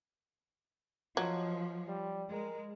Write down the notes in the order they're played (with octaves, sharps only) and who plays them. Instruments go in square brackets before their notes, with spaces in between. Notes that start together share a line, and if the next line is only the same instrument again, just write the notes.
[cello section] F3 [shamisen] F#3 [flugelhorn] D#5
[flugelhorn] G3
[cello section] G#3 [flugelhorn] A#4